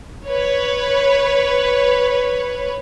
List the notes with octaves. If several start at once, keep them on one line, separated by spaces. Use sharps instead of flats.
B4 C#5